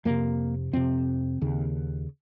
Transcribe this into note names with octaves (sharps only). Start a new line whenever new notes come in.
F2 C3 A#3
F2 C3 C4
D#2 C#3